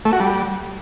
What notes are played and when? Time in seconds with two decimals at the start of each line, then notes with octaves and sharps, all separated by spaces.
0.05 A3
0.13 F#4
0.20 G3